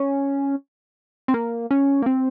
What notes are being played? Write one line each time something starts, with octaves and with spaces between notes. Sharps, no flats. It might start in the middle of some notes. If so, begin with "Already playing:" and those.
Already playing: C#4
C4
A#3
C#4
A#3
C4